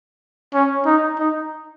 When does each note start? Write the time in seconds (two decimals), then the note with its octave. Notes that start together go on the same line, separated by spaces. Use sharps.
0.54 C#4
0.86 D#4
1.19 D#4